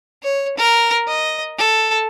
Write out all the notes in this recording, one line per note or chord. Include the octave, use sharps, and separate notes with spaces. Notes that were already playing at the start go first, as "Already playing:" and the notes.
C#5
A#4
D#5
A4